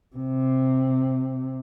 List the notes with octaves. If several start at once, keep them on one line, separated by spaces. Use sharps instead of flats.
C3